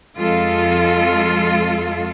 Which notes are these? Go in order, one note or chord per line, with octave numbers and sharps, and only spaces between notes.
F2 G#3 F4 A4